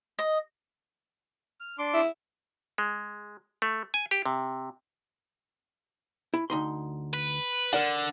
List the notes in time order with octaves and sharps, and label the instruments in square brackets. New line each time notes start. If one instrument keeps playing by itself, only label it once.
[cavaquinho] D#5
[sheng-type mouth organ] F6
D4 C6 D6
[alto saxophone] E4
[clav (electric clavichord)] G#3
A3
G#5
G4
C3
[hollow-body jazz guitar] E4
D2 D#4 C6
[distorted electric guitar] B4
[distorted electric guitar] D3 [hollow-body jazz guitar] A#4 D5 F#5